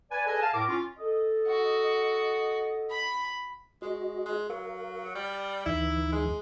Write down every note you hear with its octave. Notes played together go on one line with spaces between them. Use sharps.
B4 D5 G#5
G#4 A4 B4 D#5 G#5
F5 A5
A2 A#4 D6
C#4 F4
A4 D#5
F#4
B5
G#3 F#4 D#5
G#3
F#3 A#4 F5
G3 F6 A6
D2 E3 D#4 E4
G#3